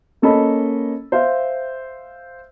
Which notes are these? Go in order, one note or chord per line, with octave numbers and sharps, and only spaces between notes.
A#3 C#4 A4 D#5 B5
C5 E5 F5